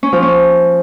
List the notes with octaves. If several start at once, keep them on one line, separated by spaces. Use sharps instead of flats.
C#4
F3
C#4